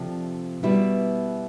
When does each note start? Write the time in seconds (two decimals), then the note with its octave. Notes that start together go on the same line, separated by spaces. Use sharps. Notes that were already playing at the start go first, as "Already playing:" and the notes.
Already playing: C3 F3 A3 D4
0.63 B2 G3 E4